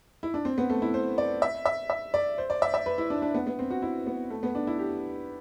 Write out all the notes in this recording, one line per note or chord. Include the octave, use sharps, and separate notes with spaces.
E4
D4
C4
B3
A3
E4
C5
D5
E5
E5
E5
D5
C5
D5
E5
E5
B4
E4
D4
D4
B3
B3
C4
F#4
E4
B3
A3
B3
D4
E4
G4